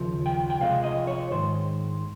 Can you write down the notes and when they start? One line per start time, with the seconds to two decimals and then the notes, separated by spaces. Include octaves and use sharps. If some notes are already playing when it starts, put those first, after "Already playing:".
Already playing: D#2 C#3 F3
0.26 G5
0.50 G5
0.60 C2 C3 F3 G#3 F5
0.84 D#5
1.07 C#5
1.31 G#2 D#3 G#3 C5